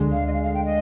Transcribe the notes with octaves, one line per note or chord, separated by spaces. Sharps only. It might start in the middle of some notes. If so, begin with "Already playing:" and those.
Already playing: D2 D3 G#3
F5
D#5
F5
F5
G5
D#5